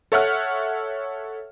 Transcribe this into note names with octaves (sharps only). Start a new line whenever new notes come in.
A4 C#5 E5 F#5 F6